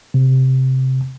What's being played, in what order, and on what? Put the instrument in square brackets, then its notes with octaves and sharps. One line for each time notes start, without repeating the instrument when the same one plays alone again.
[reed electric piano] C3